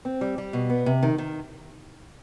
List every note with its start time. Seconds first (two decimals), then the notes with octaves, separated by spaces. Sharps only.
0.05 C4
0.21 G3
0.38 G3
0.53 B2
0.70 B3
0.86 C3
1.03 D#3
1.18 D#3